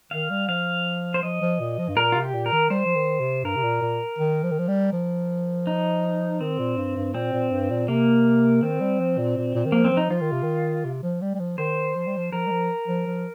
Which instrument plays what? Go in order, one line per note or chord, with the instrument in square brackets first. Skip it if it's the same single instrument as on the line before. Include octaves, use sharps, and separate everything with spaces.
[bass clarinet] D#3 [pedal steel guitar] F5
[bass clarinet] G3
[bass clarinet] F3 [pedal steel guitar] F5
[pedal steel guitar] C5
[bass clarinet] F3 [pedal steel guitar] D#5
[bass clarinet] F3
A#2
F3
G2
[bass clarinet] A#2 [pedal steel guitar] A#4
[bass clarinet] C3 [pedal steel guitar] F4
[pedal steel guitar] G4
[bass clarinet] A#2
[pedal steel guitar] A#4
[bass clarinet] D#3
[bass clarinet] G3 [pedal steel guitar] C5
[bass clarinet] F3
D#3
C3
[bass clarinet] G2 [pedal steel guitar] A#4
[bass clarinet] C3
A#2
A#2
D#3
F3
D#3
F3
G3
F3
[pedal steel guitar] D#4
[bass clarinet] D#3 [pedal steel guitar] C4
[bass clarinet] A#2
G2
G2
[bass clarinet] A#2 [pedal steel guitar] C4
[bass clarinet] A#2
G2
A#2
[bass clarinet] C3 [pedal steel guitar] A#3
[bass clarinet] D#3 [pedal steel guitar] C4
[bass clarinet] G3
F3
A#2
A#2
A#2
D#3
[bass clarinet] F3 [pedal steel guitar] A#3
[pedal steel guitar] C4
[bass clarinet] F3
[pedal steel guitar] D#4
[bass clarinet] F3 [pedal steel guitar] F4
[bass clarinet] D#3
C3
D#3
C3
F3
G3
G3
F3
[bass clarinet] D#3 [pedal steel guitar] C5
[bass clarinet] F3
G3
F3
[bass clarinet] F3 [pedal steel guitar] A#4
[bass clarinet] G3
F3
F3
F3